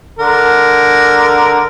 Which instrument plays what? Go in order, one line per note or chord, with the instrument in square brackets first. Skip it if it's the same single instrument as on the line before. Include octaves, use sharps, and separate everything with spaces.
[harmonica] D3 A#4